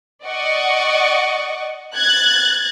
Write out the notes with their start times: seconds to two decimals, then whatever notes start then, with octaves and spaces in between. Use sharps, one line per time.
0.24 D5 D#5 F#5 C#6
1.96 F#6 G#6 A6